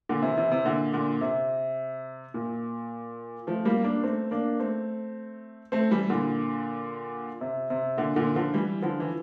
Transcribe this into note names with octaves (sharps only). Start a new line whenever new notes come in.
A#2 D3
C3 E3
C3 E3
C3
A#2 D3
A#2 D3
C3
A#2
F3 A3
G3 A#3
A#3 D4
A3 C4
A#3 D4
A3 C4
A3 C4
E3 G3
A#2 D3
C3
C3
A#2 D3
A#2 D3
D3 F3
E3 G3
D3 F3
E3